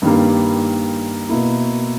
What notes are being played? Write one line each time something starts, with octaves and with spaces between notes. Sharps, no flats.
G2 D#3 G3 A#3
B2 A#3 E4